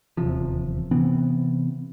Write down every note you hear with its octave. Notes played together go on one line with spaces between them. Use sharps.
D#1 E2 C3 F3
C3 E3 B3 C4